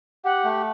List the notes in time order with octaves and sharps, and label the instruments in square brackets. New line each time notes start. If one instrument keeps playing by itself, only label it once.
[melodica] G4 [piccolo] F#5
[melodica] A3